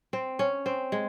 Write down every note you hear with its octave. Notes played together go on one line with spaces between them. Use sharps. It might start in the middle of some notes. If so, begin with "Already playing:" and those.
C4
C#4
C4
G#3